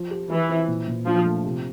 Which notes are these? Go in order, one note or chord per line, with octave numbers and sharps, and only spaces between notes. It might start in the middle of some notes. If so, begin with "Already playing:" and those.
Already playing: F3
G4
E3 E4
C4
A#2
A#2
F3 D4
A3
C3